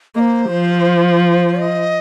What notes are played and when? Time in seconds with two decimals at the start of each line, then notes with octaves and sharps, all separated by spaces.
0.15 A#3 D#5
0.20 C5
0.51 F3
1.61 D#5